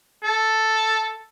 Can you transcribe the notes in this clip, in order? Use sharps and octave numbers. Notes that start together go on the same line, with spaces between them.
A4